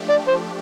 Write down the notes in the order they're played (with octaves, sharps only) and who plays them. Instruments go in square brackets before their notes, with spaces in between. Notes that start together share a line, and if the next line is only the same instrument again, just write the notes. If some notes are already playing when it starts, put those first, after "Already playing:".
Already playing: [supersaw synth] F3 A3 D4 G4
[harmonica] D5
C5